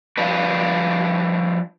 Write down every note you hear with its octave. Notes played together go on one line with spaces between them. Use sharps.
F3 G3 D4 B4